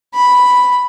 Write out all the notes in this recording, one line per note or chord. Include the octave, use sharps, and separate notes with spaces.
B5